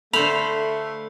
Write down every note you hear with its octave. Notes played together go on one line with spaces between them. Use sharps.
D3 A3 C5 F5 B5 F7